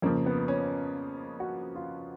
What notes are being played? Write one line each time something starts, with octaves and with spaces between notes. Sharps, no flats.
F2 C#3 F3 A#3
B3
C#4
F#4
F4